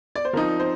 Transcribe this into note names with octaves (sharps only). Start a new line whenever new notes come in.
D5
C5
F3 C4 D#4 A#4
C5